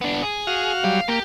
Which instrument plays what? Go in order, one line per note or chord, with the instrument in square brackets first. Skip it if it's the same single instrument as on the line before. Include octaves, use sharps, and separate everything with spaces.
[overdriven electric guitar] B3 D4
G#4
[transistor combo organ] F#4 F5
[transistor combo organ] F#3 G3 [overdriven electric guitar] F5
[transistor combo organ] A#3 [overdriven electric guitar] G4